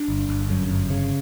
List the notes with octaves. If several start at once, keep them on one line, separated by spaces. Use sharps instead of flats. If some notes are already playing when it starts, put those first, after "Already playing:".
Already playing: D4
G1
G1
F#2
G1
C#3